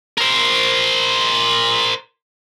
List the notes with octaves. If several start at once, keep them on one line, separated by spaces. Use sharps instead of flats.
A#4 C5